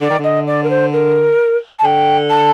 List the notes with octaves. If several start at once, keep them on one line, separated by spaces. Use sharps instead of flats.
D3 D5
D#3
D3 D#5
D5
A#4
C5
A#4
A5
D3 G5
A5